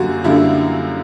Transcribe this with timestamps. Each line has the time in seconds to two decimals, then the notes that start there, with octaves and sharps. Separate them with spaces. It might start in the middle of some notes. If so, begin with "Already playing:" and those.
Already playing: F#2 D3 G3 A#3 F#4
0.24 F#2 D3 G3 A#3 E4